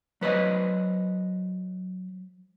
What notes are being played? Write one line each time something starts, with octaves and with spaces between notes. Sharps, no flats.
F#3 B4 C5 D#5